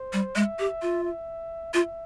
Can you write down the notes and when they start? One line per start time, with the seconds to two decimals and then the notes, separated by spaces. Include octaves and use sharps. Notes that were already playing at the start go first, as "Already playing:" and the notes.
Already playing: C5
0.13 G3
0.36 G#3 E5
0.59 G4
0.82 F4
1.04 E5
1.74 F4 E5